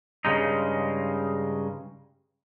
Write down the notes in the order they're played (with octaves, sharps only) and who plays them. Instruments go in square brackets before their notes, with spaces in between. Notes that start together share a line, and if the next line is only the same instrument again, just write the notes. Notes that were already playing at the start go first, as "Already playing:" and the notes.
[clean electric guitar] G2 C#3 G#3 D#4